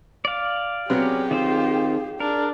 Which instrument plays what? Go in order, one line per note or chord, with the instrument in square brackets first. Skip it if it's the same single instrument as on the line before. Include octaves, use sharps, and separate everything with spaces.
[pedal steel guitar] D5 F5
[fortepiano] C3 F#3 B3 [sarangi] C#4 [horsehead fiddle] G4 G#4
[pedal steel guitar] D#3 C4 C5 [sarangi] F4
[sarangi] D4 [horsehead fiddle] G#4 [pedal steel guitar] A#4